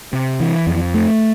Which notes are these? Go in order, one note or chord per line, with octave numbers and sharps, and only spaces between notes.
C3
E3
F2
A3